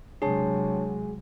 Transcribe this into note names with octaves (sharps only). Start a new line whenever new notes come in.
C3 F#3 G#3 D4 G#4 C#5 A5